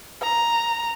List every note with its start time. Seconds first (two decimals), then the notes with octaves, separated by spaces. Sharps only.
0.22 A#5